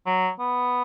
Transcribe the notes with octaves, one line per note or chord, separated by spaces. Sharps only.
F#3
B3